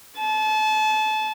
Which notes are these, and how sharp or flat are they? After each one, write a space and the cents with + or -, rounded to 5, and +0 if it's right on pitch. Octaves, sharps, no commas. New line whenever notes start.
A5 -30